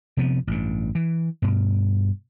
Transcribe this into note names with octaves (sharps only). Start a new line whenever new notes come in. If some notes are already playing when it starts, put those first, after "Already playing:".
C3 F3 B3
A1 G2
E3
G2 B2